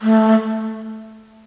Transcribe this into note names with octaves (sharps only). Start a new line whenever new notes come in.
A3